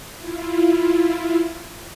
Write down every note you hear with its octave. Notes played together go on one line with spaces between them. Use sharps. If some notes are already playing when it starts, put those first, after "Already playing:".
E4 F4